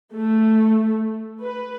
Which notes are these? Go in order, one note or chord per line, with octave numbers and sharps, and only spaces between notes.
A3
B4